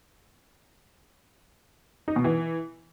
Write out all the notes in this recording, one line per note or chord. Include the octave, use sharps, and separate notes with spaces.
D#4
B2
E3